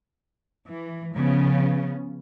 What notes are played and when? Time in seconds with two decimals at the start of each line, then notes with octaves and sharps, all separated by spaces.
0.68 E3
1.15 C#3 F3 B3 C#4